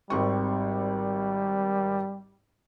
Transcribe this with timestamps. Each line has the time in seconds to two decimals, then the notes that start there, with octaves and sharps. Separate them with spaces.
0.10 G#1 G3 C4 C#6